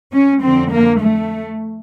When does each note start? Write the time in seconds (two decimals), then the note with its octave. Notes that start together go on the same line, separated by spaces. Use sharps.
0.13 C#4
0.42 F2 D3 F3 C4
0.71 A#3
1.00 A3